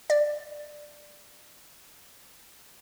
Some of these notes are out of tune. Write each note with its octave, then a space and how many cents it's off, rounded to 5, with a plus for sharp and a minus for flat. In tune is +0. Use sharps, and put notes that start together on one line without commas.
D5 +15